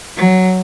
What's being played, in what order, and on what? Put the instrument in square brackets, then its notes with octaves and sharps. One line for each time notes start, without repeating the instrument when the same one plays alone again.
[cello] F#3